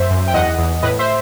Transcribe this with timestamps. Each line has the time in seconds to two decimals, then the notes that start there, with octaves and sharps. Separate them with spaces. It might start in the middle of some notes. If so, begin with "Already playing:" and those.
Already playing: F#2 C5 E5
0.11 F#2
0.28 G5
0.34 E2 D#5 F#5
0.58 E2
0.83 A2 B4 D#5
0.99 C5 E5